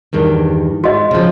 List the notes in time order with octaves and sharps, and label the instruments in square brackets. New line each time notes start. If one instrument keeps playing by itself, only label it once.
[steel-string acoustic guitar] E2 G2 D#3
[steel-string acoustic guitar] G#2 [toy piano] F#4 D#5
[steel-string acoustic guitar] C#3 F3